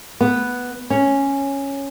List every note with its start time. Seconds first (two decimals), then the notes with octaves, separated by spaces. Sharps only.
0.20 B3
0.90 C#4